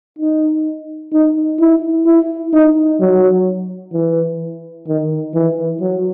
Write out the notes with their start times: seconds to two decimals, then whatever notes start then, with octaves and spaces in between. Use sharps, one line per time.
0.19 D#4
1.13 D#4
1.60 E4
2.06 E4
2.53 D#4
3.00 F#3
3.93 E3
4.88 D#3
5.35 E3
5.81 F#3